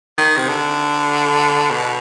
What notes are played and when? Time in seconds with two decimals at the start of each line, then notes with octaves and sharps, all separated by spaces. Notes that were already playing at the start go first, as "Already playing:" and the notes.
0.18 D#3
0.37 C3
0.49 D3
1.71 B2